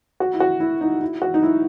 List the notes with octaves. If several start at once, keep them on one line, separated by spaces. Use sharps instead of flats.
F#4
E4
F#4
E4
D#4
E4
F#4
D#4
E4